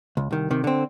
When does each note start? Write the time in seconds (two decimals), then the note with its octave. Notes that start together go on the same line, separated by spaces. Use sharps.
0.17 C#2
0.31 C2 D#3
0.51 C3 D#3
0.64 D3 C4